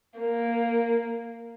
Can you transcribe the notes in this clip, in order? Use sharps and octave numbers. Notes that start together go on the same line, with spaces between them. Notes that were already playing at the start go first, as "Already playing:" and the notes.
A#3